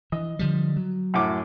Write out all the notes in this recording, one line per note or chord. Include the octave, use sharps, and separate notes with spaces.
E3 D#5
D3 F3 G3
F#3
F#2 A2 D6